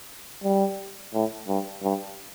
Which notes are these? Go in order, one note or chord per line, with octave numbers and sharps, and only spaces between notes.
G3
A2
G2
G2